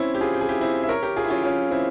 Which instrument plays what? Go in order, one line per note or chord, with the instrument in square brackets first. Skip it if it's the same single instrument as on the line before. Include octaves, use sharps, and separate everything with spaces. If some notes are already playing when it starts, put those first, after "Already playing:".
Already playing: [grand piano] C4 C#4 E4
G4
F4 G#4
G4
G#4
E4 G4
C4 E4
E5
A#4 C#5
G4 A#4
F4 G#4
E4
C#4 F4
C#4 F4
C4 E4